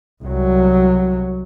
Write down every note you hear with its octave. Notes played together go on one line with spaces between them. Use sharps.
C2 F#3